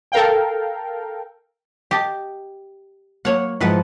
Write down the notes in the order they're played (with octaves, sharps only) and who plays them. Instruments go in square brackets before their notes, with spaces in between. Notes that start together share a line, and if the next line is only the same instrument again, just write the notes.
[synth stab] A4 A#4 F5 G5
[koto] G4 D#5 A5
[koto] F#3 C#5 F#5 [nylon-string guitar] A#3
[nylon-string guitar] G#2 F3 E4 [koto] D#3 B4 F#5